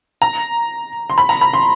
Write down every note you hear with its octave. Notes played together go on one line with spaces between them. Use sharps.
A#5
C6
B5
A#5
B5
C6